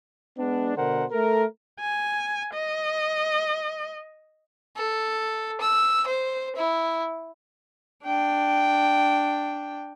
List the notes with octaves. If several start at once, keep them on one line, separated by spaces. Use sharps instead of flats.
G#3 B3 D4
B2 D3 A#4 C5 F#5
A3 A4 A#4
G#5
D#5
A4
E6
C5
E4
D4 G5